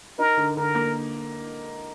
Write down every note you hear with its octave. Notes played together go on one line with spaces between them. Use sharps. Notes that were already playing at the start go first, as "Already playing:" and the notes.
D#4 A#4
D3
D3 A#4
A#3